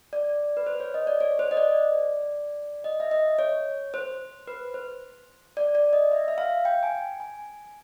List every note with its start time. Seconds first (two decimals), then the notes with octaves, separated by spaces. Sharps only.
0.13 D5
0.57 B4
0.66 C5
0.80 C#5
0.94 D#5
1.07 D5
1.20 C#5
1.39 C5
1.51 D#5
1.57 D5
2.84 D#5
3.00 E5
3.11 D#5
3.39 C#5
3.94 C5
4.47 B4
4.74 C5
5.57 D5
5.75 D5
5.93 D#5
6.11 E5
6.28 E5
6.38 F5
6.65 G5
6.83 G#5
7.20 G#5